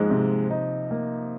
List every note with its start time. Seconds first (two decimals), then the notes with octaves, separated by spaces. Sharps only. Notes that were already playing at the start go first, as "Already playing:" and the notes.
Already playing: G#2 F3 G#3 A#3
0.10 C3
0.50 D#4
0.91 A#3